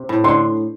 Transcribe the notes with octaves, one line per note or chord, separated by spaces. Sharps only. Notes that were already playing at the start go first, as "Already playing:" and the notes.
Already playing: C3
A2
D3 C6